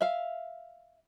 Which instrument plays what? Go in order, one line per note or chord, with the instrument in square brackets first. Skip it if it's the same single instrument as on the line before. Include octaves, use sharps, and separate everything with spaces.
[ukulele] E5 F5